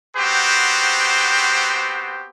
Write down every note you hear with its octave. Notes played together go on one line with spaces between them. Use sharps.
B3 C4 F#4 G4 C5